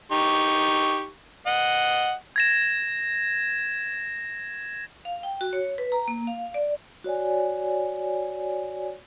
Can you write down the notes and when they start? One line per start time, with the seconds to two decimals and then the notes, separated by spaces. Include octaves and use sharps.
0.12 D#4 G4 C#6
1.47 D#5 F#5
2.36 G#6 A#6 E7
5.05 F5
5.23 G5
5.41 F#4
5.53 C#5
5.78 B4
5.92 A#5
6.08 A#3
6.27 F5
6.54 D5
7.04 F#4 C#5 D5 G#5